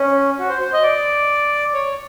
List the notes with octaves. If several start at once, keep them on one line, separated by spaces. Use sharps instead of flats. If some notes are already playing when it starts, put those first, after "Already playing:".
Already playing: C#4
F#4
C5
C5
D#5
D5
C#5